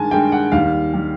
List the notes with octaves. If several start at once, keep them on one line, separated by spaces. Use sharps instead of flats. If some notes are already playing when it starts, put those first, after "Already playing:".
Already playing: G2 D#3 G#3 G#5 A5
G2 D#3 G#3 G5
F#5
D#2 D#3 G3 F5
D#3 G3